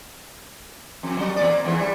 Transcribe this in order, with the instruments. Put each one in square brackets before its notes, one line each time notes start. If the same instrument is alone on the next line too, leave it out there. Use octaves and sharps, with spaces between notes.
[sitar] F2
F#3
E2 A#2 D5
A#3
E2 G#2 E3
G3